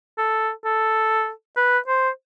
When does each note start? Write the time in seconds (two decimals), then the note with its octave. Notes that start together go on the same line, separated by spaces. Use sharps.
0.18 A4
0.65 A4
1.57 B4
1.88 C5